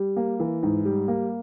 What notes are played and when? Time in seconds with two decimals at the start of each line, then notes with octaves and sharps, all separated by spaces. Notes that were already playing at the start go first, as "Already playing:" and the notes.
Already playing: G3
0.16 A#3
0.40 E3
0.63 G#2
0.85 G3
1.08 A#3